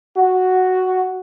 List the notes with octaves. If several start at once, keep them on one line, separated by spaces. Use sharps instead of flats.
F#4